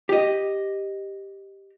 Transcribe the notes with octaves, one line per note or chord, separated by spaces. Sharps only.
G4 D#5